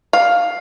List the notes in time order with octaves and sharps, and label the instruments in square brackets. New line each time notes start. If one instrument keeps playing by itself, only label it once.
[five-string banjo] F5